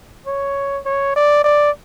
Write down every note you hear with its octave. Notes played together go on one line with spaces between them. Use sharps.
C#5
C#5
D5
D5